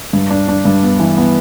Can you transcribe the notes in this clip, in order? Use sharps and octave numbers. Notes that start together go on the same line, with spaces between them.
G2
D4
D4
G2
B3
E3
B3